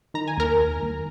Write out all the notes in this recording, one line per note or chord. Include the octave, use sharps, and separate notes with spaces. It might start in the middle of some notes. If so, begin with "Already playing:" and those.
D#3 A#5
G#5
D#2 A#4 A#5
D#2
D#2